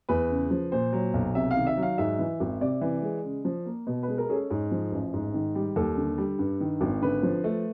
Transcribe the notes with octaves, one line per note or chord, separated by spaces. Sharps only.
E2 B4
C#3
F3
A#2 C5
F#3
B1
C3 E5
F5
D#3
E5
F#3
F5
G#2 E5
E3
G#1
C3 D5
E3
G#3
C#3
F3
A#3
B2
B4
G#3
A#4
C#4 G#4
A4
G#2
F3
A1
G#2
D#3
G3
D#2 A4
D3
G3
G2
D#3
G#1
D3 B4
F3
A3